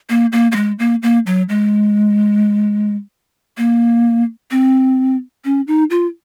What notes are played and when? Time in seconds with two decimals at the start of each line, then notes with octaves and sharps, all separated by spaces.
0.10 A#3
0.32 A#3
0.52 A#3
0.56 G#3
0.79 A#3
1.03 A#3
1.26 F#3
1.49 G#3
3.58 A#3
4.51 C4
5.45 C#4
5.67 D#4
5.90 F4